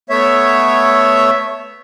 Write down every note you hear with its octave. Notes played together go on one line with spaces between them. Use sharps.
A3 B3 C#5 E5